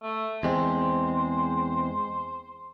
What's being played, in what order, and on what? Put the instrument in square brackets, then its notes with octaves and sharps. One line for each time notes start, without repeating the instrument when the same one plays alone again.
[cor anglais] A3
[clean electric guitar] E2 G#3 C4 [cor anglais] C5